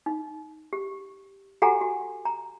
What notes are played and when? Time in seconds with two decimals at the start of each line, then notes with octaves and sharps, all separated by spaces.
0.06 D#4
0.73 G4
1.62 F#4 G4 A4 F#5 G#5 A#5
1.81 F#4
2.25 A#5